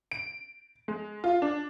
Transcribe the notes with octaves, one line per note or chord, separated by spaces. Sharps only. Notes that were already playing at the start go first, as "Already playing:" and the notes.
D7
G#3
F4
D4